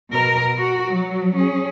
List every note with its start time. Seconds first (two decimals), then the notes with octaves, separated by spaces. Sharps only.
0.10 B2 A#4
0.58 F#4
0.89 F#3
1.35 C#4 G#4